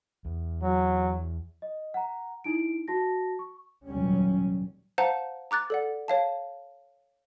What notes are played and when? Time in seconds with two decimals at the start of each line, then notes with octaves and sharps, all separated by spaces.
0.25 E2
0.63 F#3
1.62 D#5
1.94 F#5 A#5
2.44 D#4 E4 D7
2.88 F#4 A5 A#6
3.39 C#6
3.87 F1 D#2 A#2 F#3 G3 C#4
4.98 C5 F5 F#5 A5 A#5
5.51 A#5 D6 F#6 A6
5.70 A4 D5 F#5
6.08 C#5 F5 A5